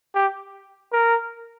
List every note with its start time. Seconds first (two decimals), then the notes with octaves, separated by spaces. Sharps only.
0.15 G4
0.92 A#4